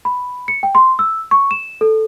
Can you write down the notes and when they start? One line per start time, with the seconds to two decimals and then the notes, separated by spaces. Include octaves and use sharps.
0.05 B5
0.48 C#7
0.63 G5
0.75 C6
0.99 E6
1.31 C#6
1.51 E7
1.81 A4